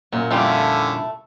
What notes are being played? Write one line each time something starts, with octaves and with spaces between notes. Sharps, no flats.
F#2 A#2
F2 D3 G3 A3 C#4 E4 F4 G4